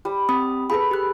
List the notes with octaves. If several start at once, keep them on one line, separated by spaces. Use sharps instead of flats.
G3
C4 B5 D#6
G#4 A4 B4 B5
G4 F#6